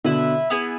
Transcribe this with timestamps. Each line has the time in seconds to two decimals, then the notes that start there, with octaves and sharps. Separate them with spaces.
0.04 B2 D3 E4 B4 E5
0.50 B3 E4 G#4 B4